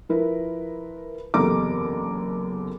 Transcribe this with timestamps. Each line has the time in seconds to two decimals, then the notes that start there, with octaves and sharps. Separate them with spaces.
0.09 F3 E4 A#4 B4
1.34 F#1 E2 C3 A4 A#5 D6